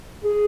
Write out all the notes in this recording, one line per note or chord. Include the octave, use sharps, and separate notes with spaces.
G#4